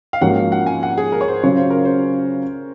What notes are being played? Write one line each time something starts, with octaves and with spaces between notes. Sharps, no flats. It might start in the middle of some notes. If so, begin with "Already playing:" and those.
F5
G#2 F3 A#3 C#4 F#4 F#5
F5
F#5
G#5
F#5
G#4
A#4
C#5
C5
C#3 F#3 C#4 F4 C#5
C5
A#4
C5